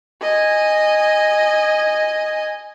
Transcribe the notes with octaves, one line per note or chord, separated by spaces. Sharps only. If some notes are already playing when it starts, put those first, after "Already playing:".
D#5 G#5